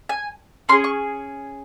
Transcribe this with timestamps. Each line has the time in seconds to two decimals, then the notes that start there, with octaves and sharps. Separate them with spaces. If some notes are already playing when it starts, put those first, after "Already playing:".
0.09 G#5
0.69 C#4 C6
0.72 G#4
0.84 C#6